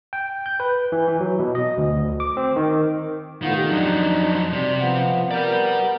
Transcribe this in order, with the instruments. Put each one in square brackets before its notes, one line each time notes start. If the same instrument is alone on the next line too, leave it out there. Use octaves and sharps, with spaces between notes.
[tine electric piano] G5
G6
B4
E3
E3
F#3
B2
D#5
D2
D6
C4
D#3
[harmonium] A2 B3 F4 [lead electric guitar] D#3
[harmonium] G4
[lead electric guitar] F2 F#3 [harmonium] D4 D#4
[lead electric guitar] C3 [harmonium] G3
[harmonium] F3 B3
[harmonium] B3 A#4 [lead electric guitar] G4 D5